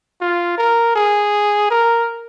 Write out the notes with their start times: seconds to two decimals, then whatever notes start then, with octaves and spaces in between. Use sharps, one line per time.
0.21 F4
0.58 A#4
0.96 G#4
1.70 A#4